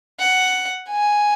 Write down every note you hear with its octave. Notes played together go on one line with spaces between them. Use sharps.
F#5
G#5